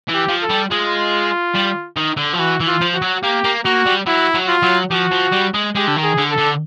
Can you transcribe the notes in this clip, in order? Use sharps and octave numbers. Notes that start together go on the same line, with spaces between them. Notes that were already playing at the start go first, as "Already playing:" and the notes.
E3
G4
F3
A4
G3
G#3 F4
G3
D#3
D3
F3
E3 F#4
E3
F4
F3
F#4
F#3
A#3 G4
A#3
A#3 F#4
G3
F#3 E4
F#3
F4
F#3
F3 F#4
F3
G3
G#3
G#3 G4
D3
D#3
G#4
D3
A4
D3